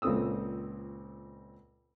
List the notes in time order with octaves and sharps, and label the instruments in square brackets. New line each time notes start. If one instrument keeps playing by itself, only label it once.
[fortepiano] C#2 A#2 C4 A4 D#6 E6